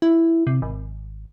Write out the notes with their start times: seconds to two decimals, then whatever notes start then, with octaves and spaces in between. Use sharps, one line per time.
0.02 E4
0.47 C3
0.62 G#1